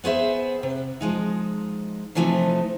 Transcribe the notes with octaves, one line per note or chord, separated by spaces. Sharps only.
B3 G#4 C5 E5
C3
F3 G#3 D#4
C3 E3 F3 A3 D#4